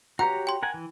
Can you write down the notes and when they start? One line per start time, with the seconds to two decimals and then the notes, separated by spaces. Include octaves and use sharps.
0.19 F#4 G4 C#5 F#5 A#5
0.47 G5 C6
0.63 A#4 F#5 G#5
0.74 E3